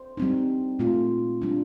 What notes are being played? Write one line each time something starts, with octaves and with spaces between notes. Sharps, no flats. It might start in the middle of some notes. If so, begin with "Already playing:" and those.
Already playing: C5
G3 C4 D#4
A#2 A3 C4 F4
G3 D4 F4